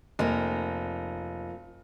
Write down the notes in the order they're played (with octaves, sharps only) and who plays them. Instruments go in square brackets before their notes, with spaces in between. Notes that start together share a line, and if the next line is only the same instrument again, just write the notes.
[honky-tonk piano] F1 [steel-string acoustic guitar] F3 A#3